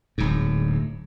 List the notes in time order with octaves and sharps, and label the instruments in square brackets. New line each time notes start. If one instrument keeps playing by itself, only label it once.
[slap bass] D1 G#2